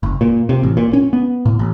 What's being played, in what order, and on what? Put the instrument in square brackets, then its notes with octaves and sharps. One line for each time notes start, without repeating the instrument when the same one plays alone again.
[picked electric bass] F#1
A#2
C3
A1
A#2
C#4
B3
A2
A1